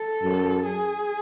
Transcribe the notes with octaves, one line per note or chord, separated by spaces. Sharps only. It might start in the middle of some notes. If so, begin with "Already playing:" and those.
Already playing: A4
F#2
G#4